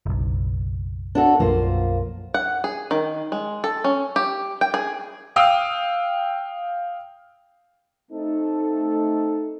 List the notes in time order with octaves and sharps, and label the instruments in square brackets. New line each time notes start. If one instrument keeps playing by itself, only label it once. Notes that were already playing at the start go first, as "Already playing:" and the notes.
[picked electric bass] F#1 B1
[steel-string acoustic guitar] D4 F#4 A4
[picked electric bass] B1 F#2 F3 [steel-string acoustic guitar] A#3 F4 C5
[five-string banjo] F#5
G#4
D#3
G#3
A4
C#4
G4
G5
G#4
[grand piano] F5 G5 D#6 E6
[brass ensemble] A3 C4 D#4 A4